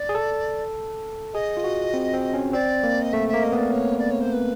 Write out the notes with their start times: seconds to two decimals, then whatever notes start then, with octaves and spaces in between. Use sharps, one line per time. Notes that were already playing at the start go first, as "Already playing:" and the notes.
Already playing: D5
0.09 G#4
0.15 A4
1.34 G#4 D#5
1.57 F4
1.64 F#4
1.94 C4
2.14 C4
2.34 C#4
2.53 C4 D5
2.84 A#3
3.02 D#5
3.13 A3 E5
3.28 A#3 E5
3.43 D#5
3.52 B3
3.57 D5
3.72 C#5
3.99 D5
4.11 C#5
4.21 C5
4.33 B4